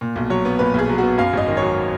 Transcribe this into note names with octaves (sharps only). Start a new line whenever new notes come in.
A#2
B1
F#3 C#5
B3
A#2 B4
B1 G#4
F#3
B3 F#4
F#2 F5
G#1 D#5
D#3
C#5
F#3